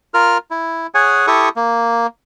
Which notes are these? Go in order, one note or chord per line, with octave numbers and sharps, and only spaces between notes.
F4 A#4 F6
E4
G#4 C#5 F#5 G#5
E4 G4 A4 C#6 D#6
A#3